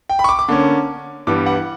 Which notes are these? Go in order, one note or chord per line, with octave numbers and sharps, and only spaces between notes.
G5
B5
C#6
D6
D6
D3 A#3 C#4
G2 E3 G3 B3 D6
F#5